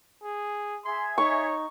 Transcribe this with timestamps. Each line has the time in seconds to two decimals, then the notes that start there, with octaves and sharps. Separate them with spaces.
0.23 G#4
0.84 G#4 E5 C6 G#6
1.18 D#4 C#5 C#6